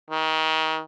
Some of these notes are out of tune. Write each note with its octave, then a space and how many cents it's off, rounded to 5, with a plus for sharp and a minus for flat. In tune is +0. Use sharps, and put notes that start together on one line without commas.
D#3 +30